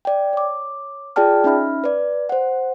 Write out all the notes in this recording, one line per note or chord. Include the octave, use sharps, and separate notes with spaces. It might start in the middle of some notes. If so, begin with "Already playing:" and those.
D5 G5
C#5 D6
F4 G#4 D5 G5 A5 F6
C#4 D#4 E5 B5 F6
B4 D5
C5 F#5